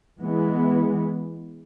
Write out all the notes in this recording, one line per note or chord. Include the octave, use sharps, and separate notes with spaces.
E3 G#3 B3